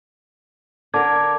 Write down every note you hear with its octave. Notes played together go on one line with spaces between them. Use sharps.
D3 A#4 A5 D6 G#6